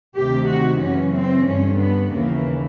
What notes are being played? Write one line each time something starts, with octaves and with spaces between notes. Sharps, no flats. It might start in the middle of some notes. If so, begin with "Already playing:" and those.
D2 C3 D#3 G4
F#4
F#2 C#3 E3 C#4
C4
G2 D3 C#4
B3
D#2 C#3 E3 A#3